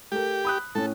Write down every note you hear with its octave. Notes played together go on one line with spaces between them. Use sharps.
A3 G4 A#4
B5 D#6 F#6
A2 C#4 A4